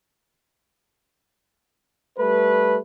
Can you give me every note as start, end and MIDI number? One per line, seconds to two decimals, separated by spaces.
2.19 2.78 55
2.19 2.78 57
2.19 2.78 71